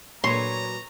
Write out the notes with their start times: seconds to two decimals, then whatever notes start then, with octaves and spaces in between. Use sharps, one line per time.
0.24 A#2 F#3 B4 C#5 A#5 C6